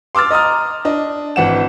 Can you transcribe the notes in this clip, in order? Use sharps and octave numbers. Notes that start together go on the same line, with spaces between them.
C6 D6 E6 F6 A6
D#5 A#5 D#6 F6
D4 D#5
G#1 E3 F#5 E7